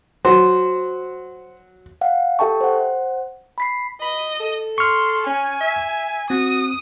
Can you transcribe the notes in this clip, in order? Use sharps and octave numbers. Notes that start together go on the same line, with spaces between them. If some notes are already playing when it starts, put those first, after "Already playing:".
F#3 C5
F5 F#5
G4 A4 E5 G5 A5 C#6
C5 F#5
B5 B6 C7
D#5 B5
A4
C6 C#6 F6
C#4 G#5
E5
C4 F#4 D#6